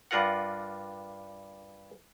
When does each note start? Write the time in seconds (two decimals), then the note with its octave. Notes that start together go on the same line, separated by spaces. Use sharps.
0.11 G2 D4 F4 A#4 F#5